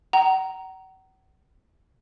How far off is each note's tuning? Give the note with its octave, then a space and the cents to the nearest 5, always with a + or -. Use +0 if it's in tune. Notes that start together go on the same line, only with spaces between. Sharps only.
F#5 +40 A#5 +0